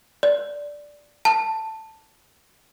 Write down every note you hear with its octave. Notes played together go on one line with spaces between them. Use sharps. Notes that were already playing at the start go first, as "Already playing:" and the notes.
D5
A5